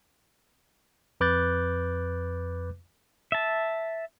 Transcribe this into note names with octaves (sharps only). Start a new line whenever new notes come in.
F2 B4 D6 F#6 G6 A6
E5 A5